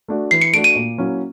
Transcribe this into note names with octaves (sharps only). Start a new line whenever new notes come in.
A3 D4 F#4
E3 C7
C#7
A3 D4 F#4 D7
D#7
A#2
F#3 A#3 C#4 E4